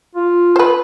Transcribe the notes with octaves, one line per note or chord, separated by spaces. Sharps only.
F4
B4 C5